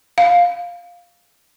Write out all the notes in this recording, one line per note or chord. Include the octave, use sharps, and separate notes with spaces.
F5